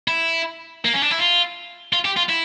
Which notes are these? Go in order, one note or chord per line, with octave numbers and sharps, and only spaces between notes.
E4
A#3
C#4
D4
E4
F4
F4
G4
F4
E4